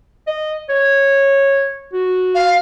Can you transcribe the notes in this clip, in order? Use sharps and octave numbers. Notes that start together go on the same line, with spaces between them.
D#5
C#5
F#4
F5